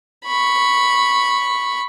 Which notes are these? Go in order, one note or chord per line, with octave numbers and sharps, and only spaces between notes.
B5 C#6